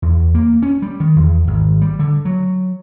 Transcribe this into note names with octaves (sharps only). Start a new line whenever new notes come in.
E2
A#3
C#4
G3
D#3
E2
G#1
G3
D3
F#3